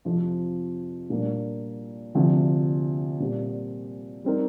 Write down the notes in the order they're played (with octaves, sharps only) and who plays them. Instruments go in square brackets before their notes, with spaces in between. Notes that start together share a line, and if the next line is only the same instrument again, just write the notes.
[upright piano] F2 C3 F3
A#2 G3 A#3 D4
D2 C3 F3
A#2 G3 C4 G4
G3 C4 D#4 A#4